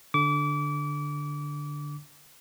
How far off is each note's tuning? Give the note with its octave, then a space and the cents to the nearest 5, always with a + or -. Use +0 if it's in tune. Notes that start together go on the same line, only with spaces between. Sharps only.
D3 +0 D6 -30